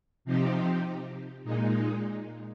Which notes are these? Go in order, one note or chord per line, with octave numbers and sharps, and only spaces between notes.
C3 F3 C4 D#4 G4
A#2 G#3 D#4